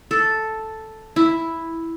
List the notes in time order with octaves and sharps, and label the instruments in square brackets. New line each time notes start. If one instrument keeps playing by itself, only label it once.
[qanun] A4
E4